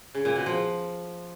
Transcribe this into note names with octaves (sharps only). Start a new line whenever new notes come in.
C#3
A#2
B2
F3